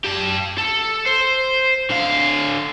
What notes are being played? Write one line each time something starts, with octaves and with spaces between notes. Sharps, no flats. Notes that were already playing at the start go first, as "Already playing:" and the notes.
G4 A5
A4
C5
D3 F5